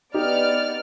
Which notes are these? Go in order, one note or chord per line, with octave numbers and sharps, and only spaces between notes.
B3 D#4 G4 D5 F6